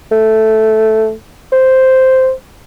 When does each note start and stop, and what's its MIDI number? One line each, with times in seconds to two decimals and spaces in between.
0.12 1.13 57
1.52 2.32 72